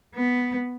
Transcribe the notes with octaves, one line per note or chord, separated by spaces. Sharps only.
B3